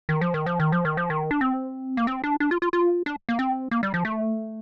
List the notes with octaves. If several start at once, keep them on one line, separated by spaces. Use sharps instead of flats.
D#3
F3
D#3
F3
D#3
F3
D#3
F3
D#3
D4
C4
A#3
C4
D4
D4
F4
F4
F4
D4
A#3
C4
A#3
G3
F3
A3